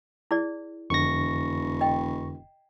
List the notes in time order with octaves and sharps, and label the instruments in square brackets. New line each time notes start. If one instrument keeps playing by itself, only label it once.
[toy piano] E4 G#4 D5
[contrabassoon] E1 [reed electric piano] F2 D3 [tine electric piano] C#6 A#6
[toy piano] D#5 G5